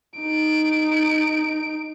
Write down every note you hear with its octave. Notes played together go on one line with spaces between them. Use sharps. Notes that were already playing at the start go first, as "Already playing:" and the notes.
D#4 D7